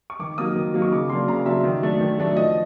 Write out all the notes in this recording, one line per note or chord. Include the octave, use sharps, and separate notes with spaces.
C#6
D#3 D6
F#3 A#3 D#4 D#6
D#3
F#3 A#3 D#4
C#6
C#3 D6
F#3 A#3 D4 C6
C#3 A#5
F#3 A#3 D4 E5
D#3
F#3 A3 D4
D#3
F#3 A3 D4
F3 D#5